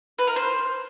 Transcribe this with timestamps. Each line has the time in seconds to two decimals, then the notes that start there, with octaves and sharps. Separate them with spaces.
0.18 B4
0.27 A#4
0.36 C5